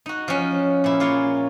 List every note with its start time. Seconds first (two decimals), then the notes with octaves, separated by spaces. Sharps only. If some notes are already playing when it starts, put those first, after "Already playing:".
0.06 D#4 F#4
0.28 F3 C#4
0.84 A#2 E4
1.00 A#3 F4 G#4 C#5